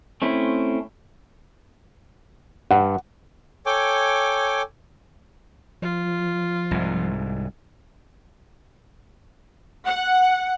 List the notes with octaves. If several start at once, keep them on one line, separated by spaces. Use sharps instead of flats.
A3 C4 C#4 E4
G2 F#5
A4 C#5 G5 G#5 D6
F3 F4
C2 G#2
F#5